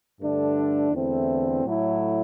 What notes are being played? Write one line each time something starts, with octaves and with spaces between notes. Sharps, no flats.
G2 D3 A3 D4
E2 D3 A3 C4 E4
A2 F#3 A3 E4